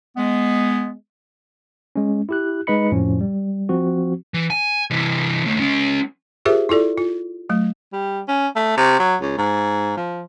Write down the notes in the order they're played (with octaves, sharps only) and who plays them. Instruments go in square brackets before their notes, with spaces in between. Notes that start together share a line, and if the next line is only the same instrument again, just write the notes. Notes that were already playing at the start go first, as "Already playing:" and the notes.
[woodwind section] G#3 B3
[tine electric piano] G#3 C#4
E4 G4 F#6
G#3 D#4 B4 D#5 B5 C#7
F2 A2 F3 C#4
G3
F3 C4 F#4
[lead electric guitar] E3
G#5
C3 E3
D#2 A3
G#3 C#4
[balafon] F4 G4 G#4 A#4 C5 E5
E4 F4 A4 D5
F4
F#3 A3
[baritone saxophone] G3
C#4
A3
C3
F#3
C#2
G#2
F3